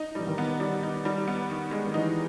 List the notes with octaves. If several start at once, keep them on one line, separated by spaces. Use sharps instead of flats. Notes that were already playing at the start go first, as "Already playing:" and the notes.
Already playing: D#4
E3 G3
D#3
B3
G3
D#4
G3
B3
D#3
G#3
D#3
E3 D#4